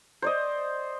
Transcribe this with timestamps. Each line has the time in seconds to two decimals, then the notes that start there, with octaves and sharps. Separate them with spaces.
0.22 C5 D5 D#5